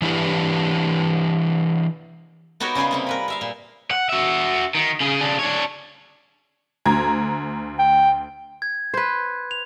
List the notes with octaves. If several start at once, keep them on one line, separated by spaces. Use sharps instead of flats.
E3 D4 E4 G4 B4
B3 D#4 F#4 G4 A#4 C#5
C#3 G3 F4 G#4 C6
C3 A#3 C4
A#4 B4 B5
A#4 E5 F5
A#2
F#5
F#4 E5
D#3
C#3 G#4
C#3 D4
D4 C#5
D2 A#5 G#6
G5
G#6
B4 C5
F7